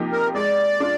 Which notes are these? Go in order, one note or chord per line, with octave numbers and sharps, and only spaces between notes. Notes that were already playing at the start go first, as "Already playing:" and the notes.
Already playing: C3 F3 A#3 D#4 G4
A#4
G#3 D5
D4 F4